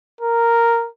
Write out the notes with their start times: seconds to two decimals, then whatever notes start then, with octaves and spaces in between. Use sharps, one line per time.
0.21 A#4